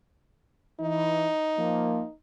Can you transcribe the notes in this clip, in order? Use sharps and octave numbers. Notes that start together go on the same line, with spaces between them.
E3 D#4
F3 A#3